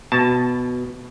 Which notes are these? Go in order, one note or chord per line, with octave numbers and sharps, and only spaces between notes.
B2 A5